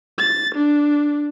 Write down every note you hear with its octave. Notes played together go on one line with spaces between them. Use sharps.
A6
D4